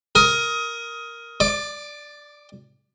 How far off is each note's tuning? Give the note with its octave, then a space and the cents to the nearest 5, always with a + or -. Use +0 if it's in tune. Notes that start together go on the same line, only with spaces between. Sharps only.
A#4 +0 D#6 +20
D5 +0 D6 +35